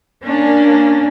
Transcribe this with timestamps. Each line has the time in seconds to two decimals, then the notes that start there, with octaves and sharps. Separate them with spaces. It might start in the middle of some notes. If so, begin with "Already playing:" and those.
0.25 A#3 C#4 D4